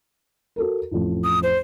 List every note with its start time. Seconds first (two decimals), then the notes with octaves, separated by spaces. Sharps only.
0.56 F#4 A4 A#4
0.91 A1 F2
1.24 D#6
1.43 C5